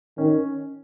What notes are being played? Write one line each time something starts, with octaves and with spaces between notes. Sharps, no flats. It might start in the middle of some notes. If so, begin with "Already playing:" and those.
D#3 C#4